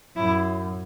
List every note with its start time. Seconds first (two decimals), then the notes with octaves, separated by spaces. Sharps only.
0.16 F#2 E4